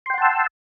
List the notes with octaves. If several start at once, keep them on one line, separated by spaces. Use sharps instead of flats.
F#5 G5 A5 C6 E6